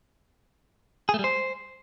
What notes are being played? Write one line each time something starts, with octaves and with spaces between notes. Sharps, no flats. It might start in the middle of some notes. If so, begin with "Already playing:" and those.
G#4
A3
G3
C5